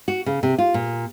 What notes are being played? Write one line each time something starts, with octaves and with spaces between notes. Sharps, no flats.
F#4
C#3
C3
F4
A#2